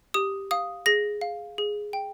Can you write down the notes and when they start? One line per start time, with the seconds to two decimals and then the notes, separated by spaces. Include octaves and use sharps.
0.14 G4 D#6
0.51 F5 D#6
0.86 G#4 A#6
1.21 F5
1.58 G#4
1.93 G5